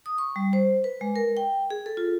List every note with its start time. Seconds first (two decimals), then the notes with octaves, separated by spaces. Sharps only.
0.06 D#6
0.18 C#6
0.36 G3
0.53 C5
0.84 B4
1.01 G#3
1.16 A#4
1.37 G5
1.70 G#4
1.86 A4
1.97 F4